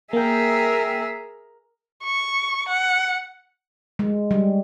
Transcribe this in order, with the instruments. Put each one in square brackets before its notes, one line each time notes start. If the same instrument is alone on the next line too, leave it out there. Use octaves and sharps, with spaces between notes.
[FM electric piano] A#3 G5 [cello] G#4 E5 [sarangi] A#4
[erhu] C#6
F#5
[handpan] G#3
G3